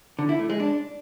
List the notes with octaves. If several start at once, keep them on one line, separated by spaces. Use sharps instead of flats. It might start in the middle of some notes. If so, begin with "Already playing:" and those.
D3
E4
A3
G#3
D4